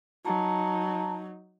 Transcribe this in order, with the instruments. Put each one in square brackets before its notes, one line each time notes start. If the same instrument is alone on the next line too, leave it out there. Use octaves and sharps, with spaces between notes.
[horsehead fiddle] F#3 D#4 [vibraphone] A5 A#5